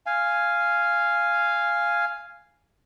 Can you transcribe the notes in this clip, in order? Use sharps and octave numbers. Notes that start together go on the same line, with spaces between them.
F5 G#5